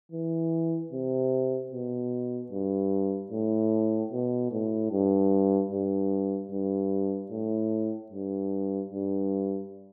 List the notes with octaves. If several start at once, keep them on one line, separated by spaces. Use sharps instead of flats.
E3
C3
B2
G2
A2
B2
A2
G2
G2
G2
A2
G2
G2